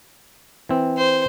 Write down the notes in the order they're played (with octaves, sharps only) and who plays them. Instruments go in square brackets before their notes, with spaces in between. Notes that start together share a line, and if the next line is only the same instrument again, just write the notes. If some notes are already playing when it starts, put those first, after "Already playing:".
[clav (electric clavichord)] E3 C4
[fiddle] C5